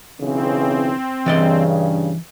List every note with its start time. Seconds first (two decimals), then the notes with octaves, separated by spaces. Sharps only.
0.21 B1 C#3 E3 C4
1.26 G2 C#3 E3 D5 D#5